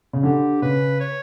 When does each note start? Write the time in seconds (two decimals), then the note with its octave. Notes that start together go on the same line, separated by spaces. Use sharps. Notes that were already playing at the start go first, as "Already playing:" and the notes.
0.13 C#3
0.23 D3 G4
0.62 C#3 B4
1.00 C#5